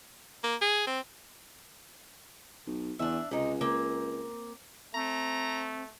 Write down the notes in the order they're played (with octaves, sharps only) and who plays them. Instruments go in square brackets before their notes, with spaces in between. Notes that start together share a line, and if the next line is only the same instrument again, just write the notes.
[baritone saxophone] A#3
G#4
C4
[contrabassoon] B1
[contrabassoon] E2 [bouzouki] D4 E5
[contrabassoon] C#2 [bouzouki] C3 D#4
[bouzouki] A#3 C4
[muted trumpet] A3 [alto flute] C4 [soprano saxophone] A#5